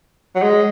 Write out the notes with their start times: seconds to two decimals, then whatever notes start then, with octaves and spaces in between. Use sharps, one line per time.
0.35 F#3
0.42 G#3